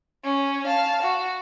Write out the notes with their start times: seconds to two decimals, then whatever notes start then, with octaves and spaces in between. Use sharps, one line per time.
0.25 C#4
0.67 F5 A5
1.03 F#4